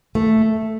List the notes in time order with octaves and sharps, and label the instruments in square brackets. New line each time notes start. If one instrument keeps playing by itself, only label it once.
[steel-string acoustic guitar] A3